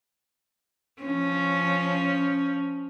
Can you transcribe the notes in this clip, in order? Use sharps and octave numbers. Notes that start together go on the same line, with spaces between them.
F3 C#4